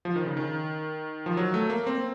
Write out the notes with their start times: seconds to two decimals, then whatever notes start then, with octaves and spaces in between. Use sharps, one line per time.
0.05 F3
0.16 D#3
0.26 C#3
0.37 D#3
1.26 F3
1.37 F#3
1.54 A3
1.70 A#3
1.87 C4